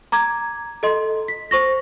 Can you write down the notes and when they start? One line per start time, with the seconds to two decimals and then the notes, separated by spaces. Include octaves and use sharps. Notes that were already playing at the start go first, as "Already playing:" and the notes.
0.12 A#5 D6 G#6
0.83 A4 D#5 C6
1.28 B6
1.51 C5 C#6 A#6